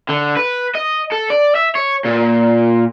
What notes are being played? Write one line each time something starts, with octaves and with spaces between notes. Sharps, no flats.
D3
B4
D#5
A4
D5
E5
C#5
A#2